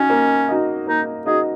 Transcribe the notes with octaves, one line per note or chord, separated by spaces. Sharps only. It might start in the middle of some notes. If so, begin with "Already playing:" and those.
Already playing: C#4 D#4 F#4 D#5
A#3
D#4 F#4 D#5
A#3 D#4
D#4 F#4 G#4 D#5